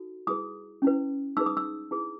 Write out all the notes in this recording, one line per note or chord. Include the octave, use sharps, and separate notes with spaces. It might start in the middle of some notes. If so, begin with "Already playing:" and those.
Already playing: D#4 F#4 A4
E4 G#4 B4 D#6
C#4 E4 B4
D#4 G#4 B4 E6
D#6
E6
E4 G#4 B4